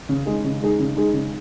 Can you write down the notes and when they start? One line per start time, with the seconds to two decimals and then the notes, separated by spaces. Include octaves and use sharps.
0.09 C#3
0.26 G#3 D#4 G#4
0.44 C#3
0.62 G#3 D#4 G#4
0.79 C#3
0.96 G#3 D#4 G#4
1.13 C#3